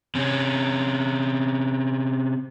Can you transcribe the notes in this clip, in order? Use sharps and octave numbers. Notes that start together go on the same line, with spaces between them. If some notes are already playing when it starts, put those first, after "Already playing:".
C3 C#4